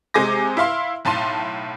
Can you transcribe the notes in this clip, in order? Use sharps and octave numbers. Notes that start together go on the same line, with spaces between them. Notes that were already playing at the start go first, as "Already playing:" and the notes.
C3 G#3 G#5 D6 A#6
E4 E5 F5 C6
B1 A2 A5 C6 D#7